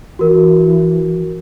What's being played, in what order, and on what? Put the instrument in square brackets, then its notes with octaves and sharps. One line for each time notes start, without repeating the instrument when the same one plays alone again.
[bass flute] E3 [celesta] F#4 A#4